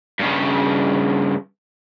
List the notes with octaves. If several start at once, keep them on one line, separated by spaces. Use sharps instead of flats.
G2 C#3